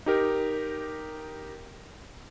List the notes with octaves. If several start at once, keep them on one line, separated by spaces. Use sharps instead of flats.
D#4 G4 A#4